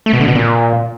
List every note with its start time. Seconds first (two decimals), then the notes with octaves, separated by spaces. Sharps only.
0.06 A3
0.13 B2
0.21 D3
0.28 B2
0.35 A#2